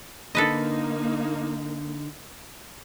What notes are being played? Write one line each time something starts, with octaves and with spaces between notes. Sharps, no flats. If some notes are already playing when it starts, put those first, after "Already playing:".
D3 A#3 D#4 A4 B4 D#5